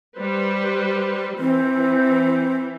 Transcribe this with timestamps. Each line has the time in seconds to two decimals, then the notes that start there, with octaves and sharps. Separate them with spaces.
0.17 G3 B4 C5
1.38 E3 C4